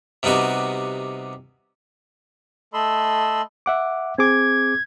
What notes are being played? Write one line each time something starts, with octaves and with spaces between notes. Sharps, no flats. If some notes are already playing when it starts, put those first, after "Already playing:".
C3 G3 B3 D#4 F#4
A3 A4 D#5 B5 C6 E6
E5 F#5 D6
C4 G#4 D6 G#6